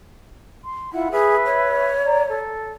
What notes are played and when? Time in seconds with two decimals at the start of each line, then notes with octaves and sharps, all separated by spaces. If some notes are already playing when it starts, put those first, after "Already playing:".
0.63 C6
0.93 E4 F4 E5 F#5
1.11 G#4 B4 E5
1.46 C#5
2.05 D5 A#5
2.29 A4